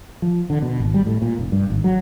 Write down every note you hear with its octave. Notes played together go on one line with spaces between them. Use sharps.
F3
D3
B2
G#1
G3
A2
A#2
F1
G2
G#1
F#3